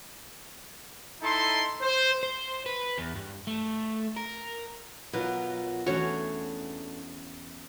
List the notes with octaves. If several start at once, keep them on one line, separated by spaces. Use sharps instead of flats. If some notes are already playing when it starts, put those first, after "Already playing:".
D#4 E4 A4 C6
C5
C5
B4
E2
G2
A3
A#4
B2 F#3 F4 A#4 B4
E2 A3 C#4 D4 F#4 C#5